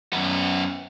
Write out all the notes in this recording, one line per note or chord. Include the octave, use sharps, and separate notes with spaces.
F#2 B3